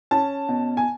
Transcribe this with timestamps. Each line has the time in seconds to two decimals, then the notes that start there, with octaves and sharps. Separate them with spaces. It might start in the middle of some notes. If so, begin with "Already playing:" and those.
0.11 C#4 A5
0.49 B2
0.77 G#5